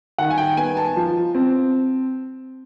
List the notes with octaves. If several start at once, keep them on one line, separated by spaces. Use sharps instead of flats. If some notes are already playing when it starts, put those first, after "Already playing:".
D#3 F#5
G#5
G5
B3 G#5
A5
F3
C4